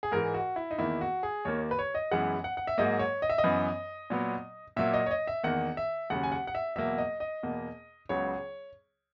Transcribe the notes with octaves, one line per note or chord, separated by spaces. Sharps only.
G#4
G#2 E3 G#3 A#4
F#4
E4
D#4
E2 D#3 A#3 E4
F#4
G#4
D#2 D#3 A#3 C#5
B4
C#5
D#5
F#2 E3 G#3 B3 F#5
F#5
F#5
E5
G#2 F#3 A#3 D#5
C#5
D#5
E5
D#5
F#2 E3 B3
A#2 F#3 B3
A#2 F#3 A#3 E5
D#5
C#5
D#5
E5
E2 D#3 A#3 F#5
E5
D#2 C#3 F#3 F#5
G#5
F#5
F#5
E5
E2 B2 F#3 A#3 E5
D#5
D#5
E2 B2 A#3
C#2 C#3 F#3 B3 C#5